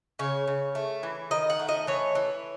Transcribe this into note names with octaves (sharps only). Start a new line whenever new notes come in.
C#3 C#5
C#3
A3
E3
D#3 D#5
F#5
A3
D#5
E3 C#5
E3